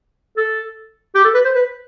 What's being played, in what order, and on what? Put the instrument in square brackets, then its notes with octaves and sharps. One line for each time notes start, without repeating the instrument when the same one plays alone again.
[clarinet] A4
G4
A4
B4
C5
B4